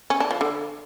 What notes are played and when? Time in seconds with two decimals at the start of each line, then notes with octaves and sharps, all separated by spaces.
0.10 C#4
0.20 D4
0.31 F3
0.41 D3